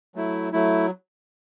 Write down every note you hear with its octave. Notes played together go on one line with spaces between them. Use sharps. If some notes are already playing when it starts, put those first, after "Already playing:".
F#3 A3 E4
F#3 A3 E4